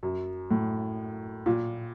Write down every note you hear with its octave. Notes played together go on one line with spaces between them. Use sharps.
F#2
A2
A#2